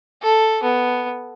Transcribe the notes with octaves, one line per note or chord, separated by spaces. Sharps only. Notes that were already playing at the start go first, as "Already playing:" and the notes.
A4
B3